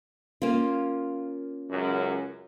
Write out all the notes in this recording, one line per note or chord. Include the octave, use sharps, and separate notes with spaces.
A#3 C#4 F4
C#2 F#2